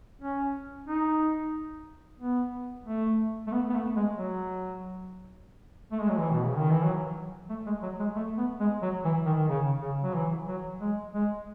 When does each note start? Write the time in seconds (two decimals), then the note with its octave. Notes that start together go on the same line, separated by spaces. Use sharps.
0.21 C#4
0.87 D#4
2.20 B3
2.86 A3
3.47 A3
3.52 B3
3.70 B3
3.74 A3
3.96 G#3
4.18 F#3
5.92 A3
6.00 G#3
6.09 F#3
6.17 E3
6.32 B2
6.44 C#3
6.57 D#3
6.71 E3
6.84 F#3
7.50 A3
7.66 G#3
7.83 F#3
7.99 G#3
8.16 A3
8.38 B3
8.60 G#3
8.82 F#3
9.05 E3
9.26 D#3
9.37 D#3
9.49 C#3
9.81 C#3
10.03 F#3
10.15 E3
10.48 F#3
10.81 G#3
11.14 G#3